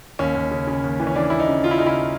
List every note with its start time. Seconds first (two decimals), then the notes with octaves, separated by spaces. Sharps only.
0.19 D#2 C#4
0.35 D#2
0.51 C#3
0.67 C#3
0.84 D#2
1.00 E3
1.07 C#4
1.15 E3 D4
1.30 E3 E4
1.40 D#4
1.48 C#3
1.63 C#3 F4
1.71 E4
1.78 C#3 D#4
1.86 E4